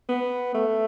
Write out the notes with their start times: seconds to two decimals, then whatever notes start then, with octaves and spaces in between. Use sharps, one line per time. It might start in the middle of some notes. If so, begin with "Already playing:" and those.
0.09 B3
0.54 A3